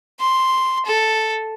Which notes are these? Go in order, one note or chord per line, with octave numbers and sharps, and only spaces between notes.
C6
A4